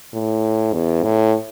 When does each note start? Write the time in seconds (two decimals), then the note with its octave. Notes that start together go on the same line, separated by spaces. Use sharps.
0.13 A2
0.73 E2
1.04 A2